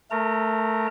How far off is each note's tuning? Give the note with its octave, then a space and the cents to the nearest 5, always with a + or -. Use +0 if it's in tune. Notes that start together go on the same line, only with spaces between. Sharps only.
A3 +0 A#4 +0 A#5 -35